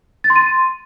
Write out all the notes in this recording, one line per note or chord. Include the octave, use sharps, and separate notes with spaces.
A6
C6
D#7